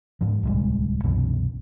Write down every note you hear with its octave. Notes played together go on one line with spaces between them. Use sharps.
G#2 F3
D1 C2 G3 G#3
C2 F#2 B2 E3